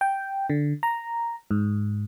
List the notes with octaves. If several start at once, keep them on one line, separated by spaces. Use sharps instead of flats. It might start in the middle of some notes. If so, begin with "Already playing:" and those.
G5
D3
A#5
G#2